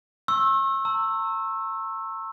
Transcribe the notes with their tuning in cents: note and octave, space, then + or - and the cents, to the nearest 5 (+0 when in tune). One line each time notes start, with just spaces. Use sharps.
C#6 -40 E6 +0
A#5 -45 E6 +0